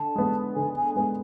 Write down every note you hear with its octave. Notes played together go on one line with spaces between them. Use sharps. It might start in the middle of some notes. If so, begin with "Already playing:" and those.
Already playing: D3 A5
G#3 B3
D3 G#5
G#5
G#3 B3 G#5